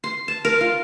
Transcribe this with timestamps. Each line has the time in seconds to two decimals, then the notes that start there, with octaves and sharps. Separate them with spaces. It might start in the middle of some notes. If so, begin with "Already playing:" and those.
0.04 C6
0.28 A5
0.45 A#4
0.61 F4